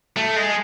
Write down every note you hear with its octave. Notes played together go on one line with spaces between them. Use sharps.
A3
G#3